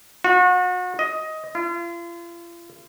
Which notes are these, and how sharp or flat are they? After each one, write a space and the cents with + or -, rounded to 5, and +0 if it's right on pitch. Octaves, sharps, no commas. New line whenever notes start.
F#4 -35
D#5 +15
F4 -40